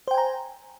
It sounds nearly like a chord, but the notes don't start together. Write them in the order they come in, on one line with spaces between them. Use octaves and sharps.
C5 G5 G#5 A#5